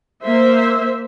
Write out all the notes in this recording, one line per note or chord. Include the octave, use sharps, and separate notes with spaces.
A#3 C5 E5